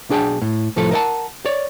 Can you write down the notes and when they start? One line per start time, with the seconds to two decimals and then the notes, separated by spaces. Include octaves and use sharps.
0.09 B1 D4 G#4 G5 A5
0.42 A2
0.76 C2 A2 F3 A3 A4
0.91 A#4 B4 D#5 F#5 A5
1.45 C#5 D5